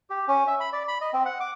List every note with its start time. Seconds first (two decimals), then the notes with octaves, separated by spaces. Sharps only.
0.10 G4
0.28 C#4
0.47 E5
0.60 B5
0.73 D5
0.88 B5
1.01 D#5
1.13 C4
1.25 F#5
1.40 D6